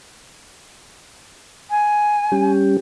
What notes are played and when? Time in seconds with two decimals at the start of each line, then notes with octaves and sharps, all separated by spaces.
1.70 G#5
2.32 G3 C#4 G4